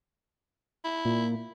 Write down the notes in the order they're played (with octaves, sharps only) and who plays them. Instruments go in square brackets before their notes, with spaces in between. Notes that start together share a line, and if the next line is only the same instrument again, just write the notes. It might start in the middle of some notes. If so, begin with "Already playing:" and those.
[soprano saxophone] E4
[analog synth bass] A#2